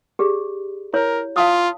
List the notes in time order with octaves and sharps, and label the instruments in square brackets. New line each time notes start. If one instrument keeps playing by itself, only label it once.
[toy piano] G4 G#4 D5
[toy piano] E4 C#5 [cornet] A#4
[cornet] F4 [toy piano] F5 A5 D#6